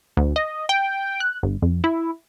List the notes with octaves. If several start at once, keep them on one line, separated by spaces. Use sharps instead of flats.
D2
D#5
G5
F#6
G1
F2
E4